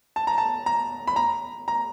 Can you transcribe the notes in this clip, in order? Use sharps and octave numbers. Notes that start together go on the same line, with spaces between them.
A5
A#5
A5
A#5
B5
A#5
A#5